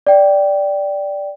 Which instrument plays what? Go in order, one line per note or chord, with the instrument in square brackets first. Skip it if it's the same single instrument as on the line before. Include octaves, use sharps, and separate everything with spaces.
[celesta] D5 G5